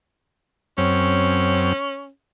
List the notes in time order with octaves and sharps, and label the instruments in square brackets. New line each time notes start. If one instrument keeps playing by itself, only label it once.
[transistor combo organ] F#2 C4 [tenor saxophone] C#4